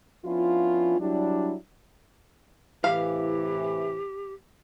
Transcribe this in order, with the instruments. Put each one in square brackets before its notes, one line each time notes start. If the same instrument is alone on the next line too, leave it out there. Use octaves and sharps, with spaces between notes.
[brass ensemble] F3 B3 C#4 D4 E4 F4
F#3 G3 D4 E4
[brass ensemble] A2 C3 E3 [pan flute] G4 [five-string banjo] F5